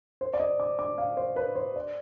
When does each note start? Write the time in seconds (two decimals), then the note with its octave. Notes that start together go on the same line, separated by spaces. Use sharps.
0.21 C5
0.34 D5
0.40 D#5
0.60 D6
0.79 D6
0.98 F5
1.17 C5
1.36 B4
1.56 C5
1.76 D5